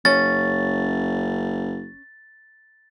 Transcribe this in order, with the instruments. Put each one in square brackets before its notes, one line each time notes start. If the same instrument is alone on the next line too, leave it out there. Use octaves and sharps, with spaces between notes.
[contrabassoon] F#1 [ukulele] C#4 [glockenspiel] A6